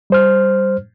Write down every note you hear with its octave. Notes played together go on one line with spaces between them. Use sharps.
G3 C5 F6